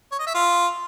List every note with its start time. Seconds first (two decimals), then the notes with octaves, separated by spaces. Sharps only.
0.12 C#5
0.19 D#5
0.27 E5
0.34 F4